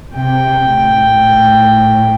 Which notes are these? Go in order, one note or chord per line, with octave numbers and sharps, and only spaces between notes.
C3 G5
A2